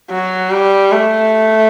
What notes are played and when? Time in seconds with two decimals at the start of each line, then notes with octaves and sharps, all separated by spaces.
0.10 F#3
0.51 G3
0.92 A3